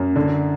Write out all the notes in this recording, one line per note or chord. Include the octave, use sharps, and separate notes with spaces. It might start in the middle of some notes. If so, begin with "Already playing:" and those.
Already playing: F#2
D3